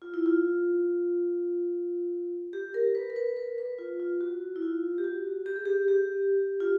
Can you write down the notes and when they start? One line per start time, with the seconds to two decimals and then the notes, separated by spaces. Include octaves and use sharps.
0.02 F4
0.14 E4
0.26 F4
2.53 G4
2.74 A#4
2.95 B4
3.10 A#4
3.16 B4
3.37 A#4
3.58 B4
3.79 F4
4.00 F4
4.21 F#4
4.56 E4
4.62 F4
4.98 G4
5.04 F#4
5.46 G4
5.56 G#4
5.65 G4
5.88 G4
6.60 F4